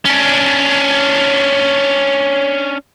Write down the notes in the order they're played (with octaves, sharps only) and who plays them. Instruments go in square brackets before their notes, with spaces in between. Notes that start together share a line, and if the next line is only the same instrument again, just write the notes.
[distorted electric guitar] C#4 D4